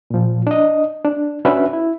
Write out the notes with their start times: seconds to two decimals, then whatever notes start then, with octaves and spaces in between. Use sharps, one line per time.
0.10 A#2 F3
0.47 D4 D#5
1.04 D4
1.45 C#4 D4 F#4 B4 E5
1.73 E4